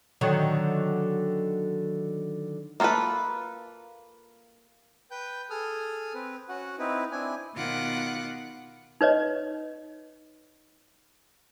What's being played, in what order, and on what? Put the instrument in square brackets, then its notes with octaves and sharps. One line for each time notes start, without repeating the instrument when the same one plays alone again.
[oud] D3 D#3 F#3
[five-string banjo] A#3 F4 G#4 A4 B4
[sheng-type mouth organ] B4 G5 G6
G#4 A4 D#6 F6
C4 B4
C#4 F#4 F#5
C4 D#4 E4 B4
C4 D4 E4 G#5
[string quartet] B2 D#3 B3 F4 F#5 D6
[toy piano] D#4 B4 C#5 D#5